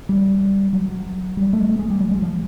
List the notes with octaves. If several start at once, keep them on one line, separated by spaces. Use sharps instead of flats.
G3
F#3
G3
A3
A3
G#3
G3
F#3
G#3
F3